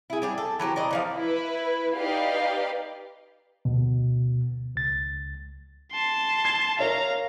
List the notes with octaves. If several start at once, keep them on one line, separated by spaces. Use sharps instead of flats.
E4 G#4
G3 D4 G#4
A4
E3 F#3 G4 C5
A#4 D5 D#5
E3 F3 F5
E4 B4
D#4 G4 B4 D5 F5
D2 B2
C#2 A6
A5 C6
G#6
A#4 C#5 E5 F5 A#5